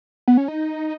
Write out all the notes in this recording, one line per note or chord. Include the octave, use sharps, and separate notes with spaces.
B3
C#4
D#4